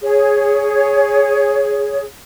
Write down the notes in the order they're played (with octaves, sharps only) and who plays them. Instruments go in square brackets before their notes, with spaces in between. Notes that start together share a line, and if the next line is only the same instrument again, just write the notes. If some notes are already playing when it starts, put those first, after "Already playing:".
[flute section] G#4 C#5